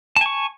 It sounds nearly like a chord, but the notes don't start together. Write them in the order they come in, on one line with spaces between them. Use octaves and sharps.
A5 G#5 C#6